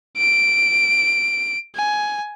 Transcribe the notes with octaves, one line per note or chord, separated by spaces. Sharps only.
D7
G#5